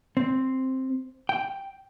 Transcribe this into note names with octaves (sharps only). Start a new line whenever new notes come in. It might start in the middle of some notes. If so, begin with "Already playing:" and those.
C4
G5